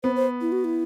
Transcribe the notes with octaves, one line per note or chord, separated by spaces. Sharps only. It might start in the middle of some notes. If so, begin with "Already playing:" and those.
B3 C5
C5
E4
F#4
E4